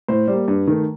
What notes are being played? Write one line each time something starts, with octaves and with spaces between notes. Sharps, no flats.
A2 C5
G3 A#3
G2
D#3 A3